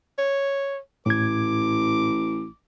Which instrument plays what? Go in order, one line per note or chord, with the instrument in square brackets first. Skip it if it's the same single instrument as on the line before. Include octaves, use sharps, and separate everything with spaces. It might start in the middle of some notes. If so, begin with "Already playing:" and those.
[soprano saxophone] C#5
[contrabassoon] A1 [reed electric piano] A2 G#6 [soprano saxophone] D6